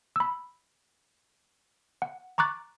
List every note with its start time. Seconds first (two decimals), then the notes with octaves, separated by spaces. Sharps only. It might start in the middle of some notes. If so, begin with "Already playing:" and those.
0.16 B5 E6
2.02 F#5
2.38 A#5 C#6 D6 F#6 A6